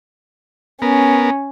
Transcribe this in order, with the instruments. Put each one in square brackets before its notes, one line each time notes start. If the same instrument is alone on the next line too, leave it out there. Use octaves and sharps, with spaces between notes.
[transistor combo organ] B3 A#4 [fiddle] C#4